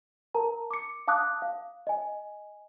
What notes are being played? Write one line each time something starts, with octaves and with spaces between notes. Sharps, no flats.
A#4 A5 A#5
D6 C#7
F5 A5 D6 D#6 F#6
F5
D#5 G#5